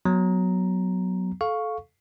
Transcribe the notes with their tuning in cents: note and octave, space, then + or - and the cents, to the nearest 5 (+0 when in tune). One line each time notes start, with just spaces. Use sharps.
F#3 +0 B3 +0 A#5 +0
A4 -20 F5 +10 C#6 +0